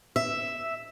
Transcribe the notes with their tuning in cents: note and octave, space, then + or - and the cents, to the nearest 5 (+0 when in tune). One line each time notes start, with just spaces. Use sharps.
E5 +0